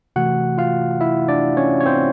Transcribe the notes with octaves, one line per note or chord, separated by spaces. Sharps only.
C3 E3 A3 F#4 F#5
F4 F5
E4 E5
D4 D5
C#4 C#5
C#5
C4 C5